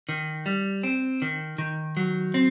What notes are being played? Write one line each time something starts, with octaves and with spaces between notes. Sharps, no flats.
D#3
G3
C4
D#3
D#3
F#3
C4